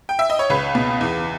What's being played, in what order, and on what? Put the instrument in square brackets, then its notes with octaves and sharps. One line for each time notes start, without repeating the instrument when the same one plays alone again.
[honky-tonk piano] G5
E5
D#5
C#5
C#2 B4
B2
E2